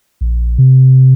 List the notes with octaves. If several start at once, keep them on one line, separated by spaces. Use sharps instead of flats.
A#1
C3